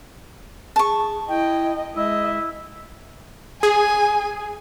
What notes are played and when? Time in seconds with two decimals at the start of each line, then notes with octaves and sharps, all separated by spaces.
0.76 G#4 A5 C#6
1.29 E4 D#5 G5
1.95 G#3 E4 D#5 E5
3.63 G#4 G#5